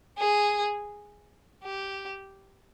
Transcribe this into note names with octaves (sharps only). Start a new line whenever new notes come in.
G#4
G4